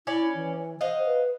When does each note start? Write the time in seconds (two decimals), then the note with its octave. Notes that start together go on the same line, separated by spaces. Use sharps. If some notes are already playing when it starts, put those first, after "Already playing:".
0.07 C#4 E4 C#5 D5
0.35 E3
0.81 C5 D#5 F5 F#5
1.06 B4